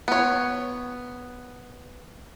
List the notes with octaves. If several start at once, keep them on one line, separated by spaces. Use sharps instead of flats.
B3 C#5